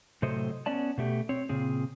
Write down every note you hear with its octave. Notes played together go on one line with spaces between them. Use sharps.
A2 C3 F#3 A4 C5 D#5
B3 C#4 D5 A5
B2 A3 G4
C4 C#5
A#2 C#3 C4 G#4